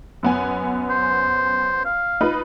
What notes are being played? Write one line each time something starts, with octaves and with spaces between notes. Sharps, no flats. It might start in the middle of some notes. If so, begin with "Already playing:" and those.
F#2 B3 G#5
C5
F5
D#4 F4 B4